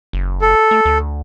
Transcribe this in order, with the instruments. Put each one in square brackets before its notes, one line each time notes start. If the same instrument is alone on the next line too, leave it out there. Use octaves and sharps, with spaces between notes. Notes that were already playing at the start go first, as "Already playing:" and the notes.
[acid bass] F#1
[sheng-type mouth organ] A4
[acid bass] A3
D2